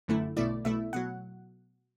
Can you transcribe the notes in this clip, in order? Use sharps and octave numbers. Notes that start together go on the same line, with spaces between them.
G1 F#2 D3 A3 E4
B1 B2 A3 E4 D5
B1 B2 A3 E4 E5
B2 F#3 F#5